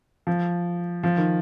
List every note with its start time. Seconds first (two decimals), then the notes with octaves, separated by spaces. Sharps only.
0.27 F3
1.03 F3
1.17 D#3